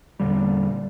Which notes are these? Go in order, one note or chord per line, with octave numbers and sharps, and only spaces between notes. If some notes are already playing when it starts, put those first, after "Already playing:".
E2 A#2 D3 G3